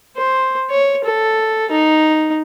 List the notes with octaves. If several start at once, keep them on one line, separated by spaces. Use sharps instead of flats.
C5
C#5
A4
D#4